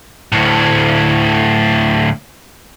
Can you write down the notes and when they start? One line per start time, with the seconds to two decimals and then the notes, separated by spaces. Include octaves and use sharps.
0.32 D2 A2